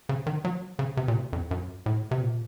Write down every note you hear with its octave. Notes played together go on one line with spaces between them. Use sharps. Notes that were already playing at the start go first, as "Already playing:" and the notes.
C#3
D#3
F#3
C#3
C3
A#2
C3
F2
F#2
A2
C3
A#2